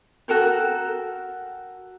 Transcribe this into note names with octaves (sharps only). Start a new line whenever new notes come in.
F#4 A4 A#4 G5